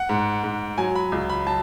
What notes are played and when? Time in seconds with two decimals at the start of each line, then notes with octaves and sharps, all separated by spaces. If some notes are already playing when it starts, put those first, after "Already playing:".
Already playing: F#5
0.09 G#2
0.44 G#2
0.78 F#3 G#5
0.95 B5
1.12 C#2
1.29 B5
1.47 F#3 A5